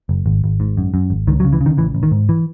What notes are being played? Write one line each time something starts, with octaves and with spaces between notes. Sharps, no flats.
F#1
G#1
G#1
G#2
F#2
F#2
G#1
C#2 D#3
F#3
C#3
E3
C#3
D#3
A1 E3
A1
D#3
G#2
E3